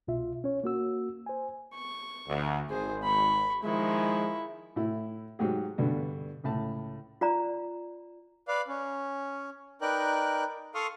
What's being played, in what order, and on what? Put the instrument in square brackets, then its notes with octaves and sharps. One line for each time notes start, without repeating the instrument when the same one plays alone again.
[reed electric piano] C2 B2 F4 E5
C#4 C#5
A#3 F#4 E6
C5 G#5
[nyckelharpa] C#6
[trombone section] D2
[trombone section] G#1 [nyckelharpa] G#4 C5
[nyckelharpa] B5 C#6
[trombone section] D#3 F3 G#3 [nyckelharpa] E4 C#6
[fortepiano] A2 E4
G#2 F#3 G#3 G4 G#4
G2 B2 D3
C#2 A2 A5
[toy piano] F4 D5 A#5
[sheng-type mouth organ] B4 D5 F5
C#4
D#4 A#4 B4 D5 G5 F#6
A4 F5 C6 C#6 D#6 F6